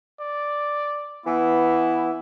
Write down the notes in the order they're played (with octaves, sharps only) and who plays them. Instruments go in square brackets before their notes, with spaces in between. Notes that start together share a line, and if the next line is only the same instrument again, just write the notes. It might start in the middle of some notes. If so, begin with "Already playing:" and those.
[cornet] D5
[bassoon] E3 [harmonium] B3 [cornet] E4